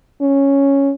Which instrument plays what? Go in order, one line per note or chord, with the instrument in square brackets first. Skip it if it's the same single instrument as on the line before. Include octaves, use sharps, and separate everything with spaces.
[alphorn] C#4